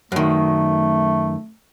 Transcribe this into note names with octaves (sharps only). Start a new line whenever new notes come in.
F#2 D#3 A3